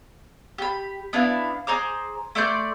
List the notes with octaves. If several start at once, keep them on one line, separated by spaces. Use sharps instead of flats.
G4 B5
B3 D4 E4 F5
G#4 C5 A#5 D6
A3 D5 C6 G6